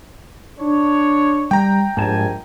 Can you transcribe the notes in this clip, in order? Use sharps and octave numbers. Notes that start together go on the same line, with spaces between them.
D4 C#5
G3 G5 A#5
A#1 G#2 G3 G#5 A5